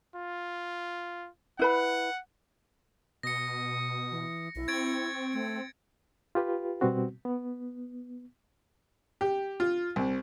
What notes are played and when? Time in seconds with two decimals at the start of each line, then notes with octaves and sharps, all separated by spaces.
0.16 F4
1.59 E4 B4 F#5 B5
3.23 B2 D#6 A#6 C#7
4.11 E3
4.56 B1 E4
4.68 C4 C#6 G#6 A6 D7
5.33 A3
6.35 F4 G4 B4
6.81 B2 G3 B3 C4 F#4
7.25 B3
9.21 G4
9.60 F4
9.96 C2